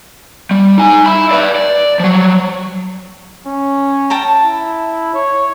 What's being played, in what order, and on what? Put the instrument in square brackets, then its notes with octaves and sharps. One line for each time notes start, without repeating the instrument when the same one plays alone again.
[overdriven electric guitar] G3
D#4 G#5
E5 B5
B4 D5
D5
F3 F#3
[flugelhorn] C#4
[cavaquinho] G5 A5 A#5
[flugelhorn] E4
C#5